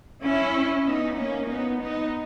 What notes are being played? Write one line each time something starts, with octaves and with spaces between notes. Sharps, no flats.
C#4 E4
B3 D#4
A#3 C#4
B3 D#4
B3 D#4